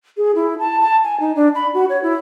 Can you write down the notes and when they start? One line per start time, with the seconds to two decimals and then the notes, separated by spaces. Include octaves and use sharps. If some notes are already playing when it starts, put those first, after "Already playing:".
0.17 G#4
0.35 E4
0.59 A5
0.80 A5
1.04 G#5
1.20 D#4
1.36 D4
1.55 B5
1.74 F#4
1.90 C#5
2.03 E4